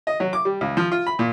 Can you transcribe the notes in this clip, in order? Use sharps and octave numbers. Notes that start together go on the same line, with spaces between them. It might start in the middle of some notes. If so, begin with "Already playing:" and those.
D#5
F#3
D6
G3
C#2
F3
F4
B5
A#2